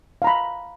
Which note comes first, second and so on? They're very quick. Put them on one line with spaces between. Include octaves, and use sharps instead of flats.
F5 A#5 B5